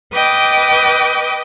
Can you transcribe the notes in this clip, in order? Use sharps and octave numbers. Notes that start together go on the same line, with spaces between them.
B4 D#5 G5 D6